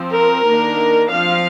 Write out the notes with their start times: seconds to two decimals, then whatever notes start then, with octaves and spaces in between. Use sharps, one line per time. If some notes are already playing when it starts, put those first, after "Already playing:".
Already playing: F3 C4
0.13 A#4
0.45 D#3 A#3 D4
1.10 F3 C4 F5